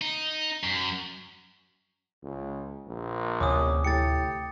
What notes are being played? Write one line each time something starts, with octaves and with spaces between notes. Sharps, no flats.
D#4
F#2
C#2
A#1
D2 C3 E3 C#4 D6 D#6
A2 G4 A6 C#7